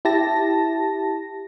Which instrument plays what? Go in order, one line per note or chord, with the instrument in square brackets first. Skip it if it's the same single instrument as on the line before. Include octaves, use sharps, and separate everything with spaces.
[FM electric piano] E4 G4 A5 A#6